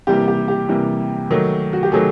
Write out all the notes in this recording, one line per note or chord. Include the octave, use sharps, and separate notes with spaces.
C3 E3 G3 A#3 G4
G4
G4
C3 E3 G3 A#3
D#3 F#3 A3
F#4
G4
D#3 F#3 A3 G#4